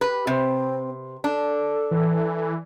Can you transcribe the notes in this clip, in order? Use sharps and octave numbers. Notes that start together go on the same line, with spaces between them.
G4 B4
C3 C4
D4 A4
E3